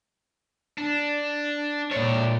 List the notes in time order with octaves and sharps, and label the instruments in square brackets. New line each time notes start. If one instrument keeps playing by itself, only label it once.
[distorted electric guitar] D4
[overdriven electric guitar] A#2 C#5 [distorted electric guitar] A3 D5